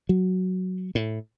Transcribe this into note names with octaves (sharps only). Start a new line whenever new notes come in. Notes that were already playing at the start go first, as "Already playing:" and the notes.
F#3
A2